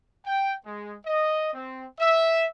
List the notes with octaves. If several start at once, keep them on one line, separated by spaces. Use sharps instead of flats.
G5
G#3
D#5
C4
E5